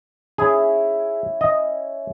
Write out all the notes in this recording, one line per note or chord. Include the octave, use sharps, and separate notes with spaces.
C#4 E4 G#4
D#5